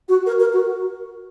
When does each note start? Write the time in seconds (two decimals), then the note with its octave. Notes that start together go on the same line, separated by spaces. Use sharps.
0.08 F#4
0.26 A#4
0.40 A#4
0.53 F#4